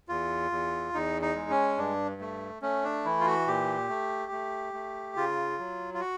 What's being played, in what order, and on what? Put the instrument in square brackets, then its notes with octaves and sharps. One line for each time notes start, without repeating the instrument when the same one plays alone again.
[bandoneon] E2 F4
E2
E2 D#4
D#4
G#3
C#4
G2 D4
A3
A3 C#4
D4
E3 E4
F4
F#4
A#2 G4
A3
A3
A3
C#3 F4
F#3
F4
F#4